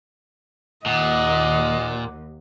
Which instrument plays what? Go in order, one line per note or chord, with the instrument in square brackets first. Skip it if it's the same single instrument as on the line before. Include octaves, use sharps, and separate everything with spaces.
[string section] D#2 [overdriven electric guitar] A#2 [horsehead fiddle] D#5 [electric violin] F#5 D6